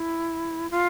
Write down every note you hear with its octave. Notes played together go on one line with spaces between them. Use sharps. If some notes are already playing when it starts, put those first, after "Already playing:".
Already playing: E4
F4